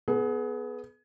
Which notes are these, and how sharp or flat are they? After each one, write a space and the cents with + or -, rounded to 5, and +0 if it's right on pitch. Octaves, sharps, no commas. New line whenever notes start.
B3 +0 G#4 +30